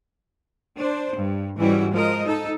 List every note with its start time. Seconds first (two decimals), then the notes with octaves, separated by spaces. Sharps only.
0.77 D4 C5
1.16 G2
1.59 G#2 E3 G3 C#4 E4 F#4
1.94 F3 G#3 A#4 D#5
2.25 D#4 A4